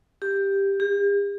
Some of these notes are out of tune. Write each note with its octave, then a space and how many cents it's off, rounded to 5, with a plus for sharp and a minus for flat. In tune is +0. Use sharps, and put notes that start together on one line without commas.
G4 +5
G4 +45